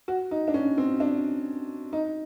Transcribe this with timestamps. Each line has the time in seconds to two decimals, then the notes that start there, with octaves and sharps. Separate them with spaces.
0.08 F#4
0.31 D#4
0.48 D4
0.54 C#4
0.78 C4
1.00 D4
1.93 D#4